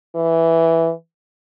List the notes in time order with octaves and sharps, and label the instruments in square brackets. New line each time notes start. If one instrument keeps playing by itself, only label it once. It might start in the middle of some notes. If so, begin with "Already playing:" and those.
[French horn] E3